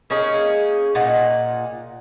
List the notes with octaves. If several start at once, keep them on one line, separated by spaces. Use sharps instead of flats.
A#3 C#4 D#4 G#4
A#2 D#4 F#5